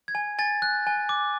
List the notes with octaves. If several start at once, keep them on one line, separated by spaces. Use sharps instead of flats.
G#6
G#5
G#5 A6
F#6
G#5
D6